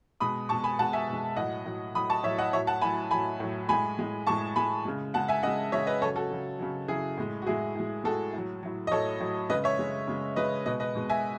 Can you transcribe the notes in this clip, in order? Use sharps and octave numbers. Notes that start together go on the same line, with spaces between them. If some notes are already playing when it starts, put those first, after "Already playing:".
B2 G#3 B5 D#6
B2 G#3 A5 C#6
G#5 B5
B2 G#3 F#5 A5
E5 G#5
B2 G#3
A2 F#3 D#5 F#5
A2 F#3
A2 F#3 B5 D#6
A5 C#6
A2 F#3 C#5 E5
D#5 F#5
A2 F#3 C#5 E5
F#5 A5
A2 F#3 G#5 B5
A2 F#3 G#5 B5
A2 F#3
A2 G#3 G#5 B5
A2 G#3
A2 G#3 A5 C#6
A2 G#3 G#5 B5
C#3 G#3
C#3 G#3 F#5 A5
E5 G#5
C#3 G#3 D#5 F#5
C#3 G#3 C#5 E5
B4 D#5
C#3 F#3 A4 C#5
F#4 A4
C#3 F#3
C#3 F#3
C#3 F#3 E4 G#4
A2 G#3
F#4
A2 G#3 E4 G#4
A2 G#3
A2 G#3 F#4 A4
A2 F#3
A2 F#3
D#5
A2 F#3 A4 C#5
A2 F#3
C#3 G#3 B4 D#5
C#5 E5
C#3 G#3
C#3 G#3
C#3 G#3 B4 D#5
B2 G#3 B4 D#5
B4 D#5
B2 G#3
E5 G#5